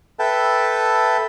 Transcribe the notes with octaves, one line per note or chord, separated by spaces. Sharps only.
A4 B4 E5 G5 A5